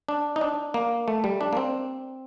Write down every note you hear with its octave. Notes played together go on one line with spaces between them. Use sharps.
D4
D#4
D4
A#3
A3
G3
D4
A#3
C4